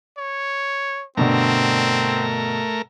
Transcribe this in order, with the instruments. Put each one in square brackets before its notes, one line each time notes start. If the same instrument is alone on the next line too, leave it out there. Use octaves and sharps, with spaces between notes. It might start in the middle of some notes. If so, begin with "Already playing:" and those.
[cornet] C#5
[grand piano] G2 B2 D3 [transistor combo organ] A3 A#4 [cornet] C4